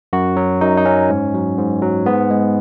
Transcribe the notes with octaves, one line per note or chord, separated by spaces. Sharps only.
F#2 F#4
F#3
F#2 D#4
D#4
F#3 C#4
G#2
F#3
G#2
F#3
G#2 B3
G#3